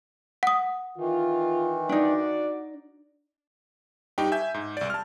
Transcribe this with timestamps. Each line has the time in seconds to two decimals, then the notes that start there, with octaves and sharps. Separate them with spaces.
0.43 F#5 D#6
0.97 D#3 E3 F4
1.89 D4 D#4 F#4 D5
4.18 G2 D#4 G4 G5
4.32 E5 G#5 G6
4.54 G#2
4.77 C2 D5
4.90 A5 F6